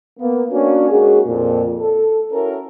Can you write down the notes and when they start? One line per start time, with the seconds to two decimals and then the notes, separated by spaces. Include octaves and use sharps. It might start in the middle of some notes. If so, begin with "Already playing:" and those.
0.19 A#3 B3
0.51 A#3 C#4 D4 F#4
0.91 G#3 A#3 C#4 D#4 F#4 G#4
1.26 F2 A#2
1.80 A4
2.33 C#4 E4 F#4 A4 A#4